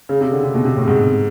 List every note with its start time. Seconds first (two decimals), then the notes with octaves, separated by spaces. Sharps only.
0.09 C#3
0.21 C3
0.32 D3
0.43 C3
0.54 B2
0.65 C3
0.77 A2
0.87 G#2